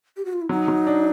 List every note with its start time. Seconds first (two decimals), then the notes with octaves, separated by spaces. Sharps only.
0.17 G4
0.25 F#4
0.33 F4
0.42 E4
0.49 F#3 D#4
0.68 F#3
0.87 D4